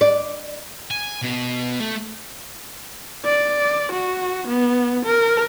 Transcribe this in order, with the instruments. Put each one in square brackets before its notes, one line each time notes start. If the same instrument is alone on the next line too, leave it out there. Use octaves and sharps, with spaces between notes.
[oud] D5
[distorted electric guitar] G#5
B2
A3
[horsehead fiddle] D5
F#4
B3
A#4